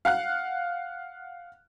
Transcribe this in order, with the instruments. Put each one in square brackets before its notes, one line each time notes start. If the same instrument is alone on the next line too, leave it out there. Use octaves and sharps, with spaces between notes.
[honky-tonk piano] F5 F#5 F#6